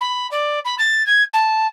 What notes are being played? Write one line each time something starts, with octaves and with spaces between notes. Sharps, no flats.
B5
D5
B5
A6
G#6
A5